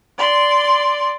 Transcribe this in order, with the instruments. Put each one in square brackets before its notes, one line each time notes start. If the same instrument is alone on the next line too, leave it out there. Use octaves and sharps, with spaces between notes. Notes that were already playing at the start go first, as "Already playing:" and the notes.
[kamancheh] D5 C6